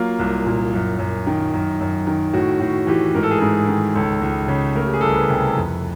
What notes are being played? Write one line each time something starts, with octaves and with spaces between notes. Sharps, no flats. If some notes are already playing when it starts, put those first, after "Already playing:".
Already playing: F#3 A#3 F4
C2
A#2
F#2
F#2
D#3
F#2
F#2
D#3
A2 F#4
A2 F#4
E3 G4
G#2 A#4
A4
G#4
G#2 A4
D#3
C#2 A4
C#2
C#3
A3 A#4
G4
G#4
C2 A4
A#4
B4
C3
F2